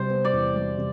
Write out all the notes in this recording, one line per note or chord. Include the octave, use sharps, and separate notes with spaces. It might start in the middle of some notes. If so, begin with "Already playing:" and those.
Already playing: C3 G3 C5
B3
D5
E2
G3
C3